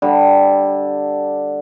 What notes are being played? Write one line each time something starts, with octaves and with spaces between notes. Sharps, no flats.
D3 G3